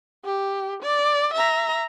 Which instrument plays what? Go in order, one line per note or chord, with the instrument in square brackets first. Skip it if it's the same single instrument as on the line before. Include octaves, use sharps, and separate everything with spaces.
[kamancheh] G4
D5
E5 A#5